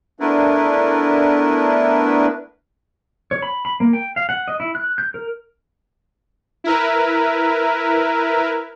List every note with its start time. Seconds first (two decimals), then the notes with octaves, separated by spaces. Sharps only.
0.20 A3 B3 D4 E4 A#4 B4
3.31 C#5
3.42 B5
3.65 B5
3.80 A#3
3.93 G5
4.16 F5
4.29 F#5
4.48 D#5
4.60 E4
4.75 F#6
4.98 G6
5.14 A#4
6.64 E4 A#4 B4